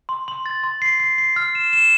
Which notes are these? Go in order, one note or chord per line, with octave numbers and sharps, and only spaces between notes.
C6
C6
A6
C6
C7
C7
C7
F6
E7
E7